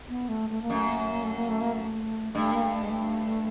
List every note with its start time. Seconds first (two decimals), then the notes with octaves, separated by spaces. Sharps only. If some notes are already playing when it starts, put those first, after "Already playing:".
0.08 B3
0.28 A3
0.50 A3
0.62 A#3
0.70 F#2 A3
0.86 A#3
0.99 A3
1.11 A#3
1.23 A3
1.36 A#3
1.49 A3
1.61 A#3
1.73 A3
2.35 G2 A3
2.52 A#3
2.63 A3
2.83 G#3
2.90 A3